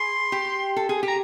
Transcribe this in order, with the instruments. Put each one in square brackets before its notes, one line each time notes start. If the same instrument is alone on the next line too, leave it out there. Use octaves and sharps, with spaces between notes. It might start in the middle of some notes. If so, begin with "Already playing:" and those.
Already playing: [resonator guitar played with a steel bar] G#4 [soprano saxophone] C6
[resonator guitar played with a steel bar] G4
A4
G#4
G4
[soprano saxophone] A#5